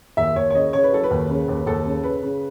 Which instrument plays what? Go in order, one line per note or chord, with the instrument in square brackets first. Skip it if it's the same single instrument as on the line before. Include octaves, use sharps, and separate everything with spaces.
[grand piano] D#2 E5
D#2 C#5
C#5
C#3 D#5
C#3 C#5
B4
F#3 A4
B4
D#2
C#3
D#2
D#2 A4
C#3
C#3 B4
C#3